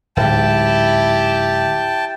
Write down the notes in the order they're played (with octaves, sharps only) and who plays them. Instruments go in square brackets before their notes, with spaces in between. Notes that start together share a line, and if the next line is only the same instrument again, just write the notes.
[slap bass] D1 G#2 [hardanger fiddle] E4 G4 [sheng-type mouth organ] G5 A5